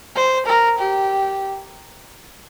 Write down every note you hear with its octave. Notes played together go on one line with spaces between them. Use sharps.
C5
A#4
G4